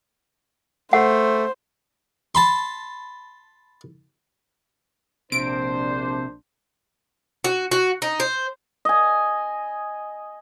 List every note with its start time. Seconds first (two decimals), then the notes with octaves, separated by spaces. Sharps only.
0.93 A3 C5 F#5
2.35 A5 B5 C6
5.32 A#1 C3 D4 C5 D7
7.44 F#4
7.71 F#4
8.02 D#4
8.20 C5
8.85 D#5 G#5